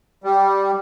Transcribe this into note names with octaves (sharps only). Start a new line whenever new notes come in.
G3